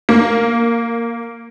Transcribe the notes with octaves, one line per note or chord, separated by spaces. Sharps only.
A#3